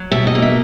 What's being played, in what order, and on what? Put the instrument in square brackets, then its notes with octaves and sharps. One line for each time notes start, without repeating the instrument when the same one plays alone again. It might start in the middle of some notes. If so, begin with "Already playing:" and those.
Already playing: [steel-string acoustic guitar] F#3
B2 E5
D#5
A#3
E5